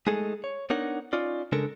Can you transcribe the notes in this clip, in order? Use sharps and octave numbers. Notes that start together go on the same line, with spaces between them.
G#3 A3 D#4 G#4 A4
C#5
B3 D4 D#4 A#4 C#5 F#5
C#4 D#4 F4 D5
C#3 G#3 D4 A4 A#4